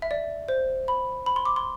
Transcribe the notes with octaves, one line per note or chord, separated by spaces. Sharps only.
E5
D5
C5
B5
B5
C6
D6
C6